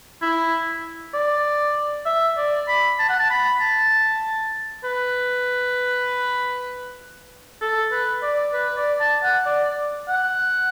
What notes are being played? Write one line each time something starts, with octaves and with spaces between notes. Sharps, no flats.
E4
D5
E5
D5
B5
A5
F#5
A5
B5
A5
B4
A4
B4
D5
B4
D5
A5
F#5
D5
F#5